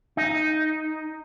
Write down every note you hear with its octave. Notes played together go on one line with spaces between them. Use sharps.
D#4